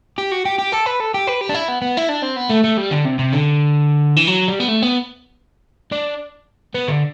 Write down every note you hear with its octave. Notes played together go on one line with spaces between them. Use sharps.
G4
F#4
G4
G4
A4
B4
A4
G4
B4
G4
D4
E4
B3
B3
E4
D4
C4
B3
A3
A3
G3
D3
C3
C3
D3
E3
F#3
G3
B3
A3
B3
D4
B3
D3